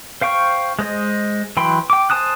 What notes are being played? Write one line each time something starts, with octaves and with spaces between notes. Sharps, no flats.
C5 F5 G5 C#6
G#3 C5 D#5
E3 F#3 G5 B5 C6
G5 D6
C5 G#5 A5 D#6 F#6